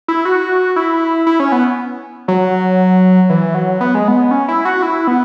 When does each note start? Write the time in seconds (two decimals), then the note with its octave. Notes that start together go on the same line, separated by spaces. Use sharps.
0.08 E4
0.25 F#4
0.76 E4
1.27 E4
1.40 C#4
1.52 B3
2.28 F#3
3.30 E3
3.55 F#3
3.81 B3
3.95 G#3
4.08 B3
4.31 C#4
4.48 E4
4.65 F#4
4.82 E4
5.07 B3